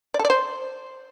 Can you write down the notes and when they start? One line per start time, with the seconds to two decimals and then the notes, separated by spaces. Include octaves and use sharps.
0.14 D5
0.19 A4
0.25 D5
0.30 C5